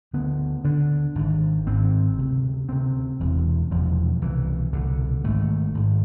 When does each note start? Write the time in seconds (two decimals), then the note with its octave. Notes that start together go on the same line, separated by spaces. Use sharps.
0.13 D2 D3 B3
0.64 D2 D3 D4
1.15 G#1 G#2
1.66 G#1 G#2 C4
2.18 D2 C3
2.68 D2 C3 C4
3.19 E1 E2 C3
3.71 E1 E2 C3 F3
4.21 C2 B2 E3
4.73 C2 B2 D3
5.24 G#1 G#2 A3
5.74 G#1 G#2